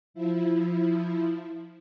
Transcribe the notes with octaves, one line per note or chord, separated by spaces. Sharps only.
F3 E4